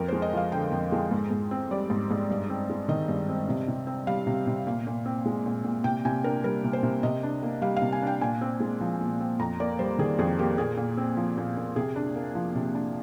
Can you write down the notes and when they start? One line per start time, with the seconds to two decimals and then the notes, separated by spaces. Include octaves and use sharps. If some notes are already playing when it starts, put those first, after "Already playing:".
Already playing: F2 A#4
0.08 G#3 C5
0.22 D#5
0.33 F3 F5
0.52 D3 G5
0.71 F2
0.92 G#3
1.11 G#2
1.31 G#2
1.51 C4
1.71 G3 D5
1.90 G#2
2.11 G#2
2.30 G2
2.50 C4
2.70 G#3
2.88 D#3 D#5
3.08 G2
3.29 C4
3.49 C3
3.68 C3
3.87 C4
4.07 G3 F5
4.27 C3
4.47 C3
4.67 A#2
4.87 A#2
5.06 C4
5.26 G#3
5.46 A#2
5.64 A#2
5.84 C3 G5
6.05 C3 G#5
6.24 D4 A#4
6.44 G3 A#4
6.64 C3
6.73 C5
6.83 C3
7.03 C3 D#5
7.23 D4
7.43 A#3
7.62 G3 F5
7.76 F5
7.82 C3
7.92 G#5
8.02 D4 G5
8.21 A#2 G#5
8.41 C4
8.60 G#3
8.81 F3
9.01 A#2
9.20 C4
9.39 F2 A#5
9.60 A#3 D5
9.79 G3 C5
9.98 D#3 G#4
10.18 F2 G#4
10.39 A#3 G4
10.58 A#2 G#4
10.77 A#2
10.97 C4
11.17 F3
11.38 A#2
11.57 A#2
11.76 C3 G#4
11.96 D4
12.16 A#3
12.35 F3
12.55 C3
12.75 D4